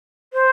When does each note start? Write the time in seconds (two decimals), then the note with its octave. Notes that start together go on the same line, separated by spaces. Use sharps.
0.33 C5